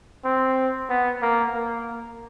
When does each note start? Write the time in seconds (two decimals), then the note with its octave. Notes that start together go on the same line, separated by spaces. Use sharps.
0.24 C4
0.90 B3
1.22 A#3
1.54 A#3